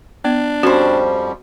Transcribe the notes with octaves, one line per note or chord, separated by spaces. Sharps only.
B3 D4
F2 F3 G3 C#4 F#4 C5